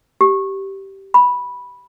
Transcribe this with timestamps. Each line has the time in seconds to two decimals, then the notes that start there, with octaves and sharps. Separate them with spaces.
0.21 G4
1.14 B5